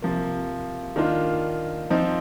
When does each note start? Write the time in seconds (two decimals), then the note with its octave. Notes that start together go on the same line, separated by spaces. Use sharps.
0.02 C3 F3 A#3
0.96 D#3 A#3 D4 F4
1.90 F3 C4 D#4